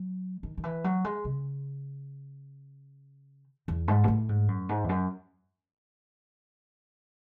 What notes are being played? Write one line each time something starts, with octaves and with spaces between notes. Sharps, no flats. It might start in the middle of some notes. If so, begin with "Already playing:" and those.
Already playing: F#3
D#3
D#3
E3
F#3
G#3
C#3
E2
G#2
B2
A2
G#2
F#2
G#2
E2
F#2